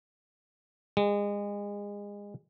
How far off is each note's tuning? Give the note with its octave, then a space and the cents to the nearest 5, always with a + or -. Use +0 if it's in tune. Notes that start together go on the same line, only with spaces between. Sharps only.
G#3 -30